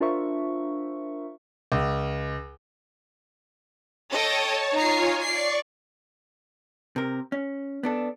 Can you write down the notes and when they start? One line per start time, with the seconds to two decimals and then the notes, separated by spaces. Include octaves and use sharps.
0.01 D4 F4 A#4 C5 E5 C#6
1.72 C#2
4.09 A4 C#5 D#5 G5 A5
4.73 D#4 F4 C#5 G#5 A#5 C7
5.21 D5 C#6 C7
6.96 C3 A#4
7.32 C#4
7.83 B3 D4 A4